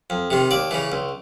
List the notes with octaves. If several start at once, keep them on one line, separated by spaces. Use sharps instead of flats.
F2
C3 D#3
D#2 D5
C#3 E3
C#2